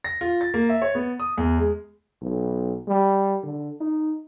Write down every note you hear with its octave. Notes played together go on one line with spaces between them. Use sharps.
A#6
F4
A6
A#3
E5
C#5
B3
D#6
E2
G#3
B1
G3
D3
D#4